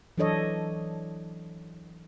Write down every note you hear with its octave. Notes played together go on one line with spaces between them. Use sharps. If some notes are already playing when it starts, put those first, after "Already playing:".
E3 F#3 D4 A4 C#5 D#5